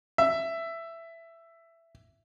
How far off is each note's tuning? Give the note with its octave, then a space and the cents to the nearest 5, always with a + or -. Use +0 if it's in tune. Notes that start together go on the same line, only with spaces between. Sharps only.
E5 +10